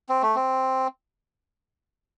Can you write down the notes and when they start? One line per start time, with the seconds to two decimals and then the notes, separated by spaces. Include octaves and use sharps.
0.09 C4
0.22 A3
0.35 C4